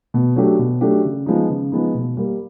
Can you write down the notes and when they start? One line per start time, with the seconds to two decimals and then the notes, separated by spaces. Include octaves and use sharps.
0.14 B2
0.36 F#3 A3 D4 G4
0.59 B2
0.81 F#3 A3 D4 G4
1.05 C#3
1.26 F3 G#3 B3 D#4
1.50 C#3
1.72 F3 G#3 B3 D#4
1.95 B2
2.17 G3 A#3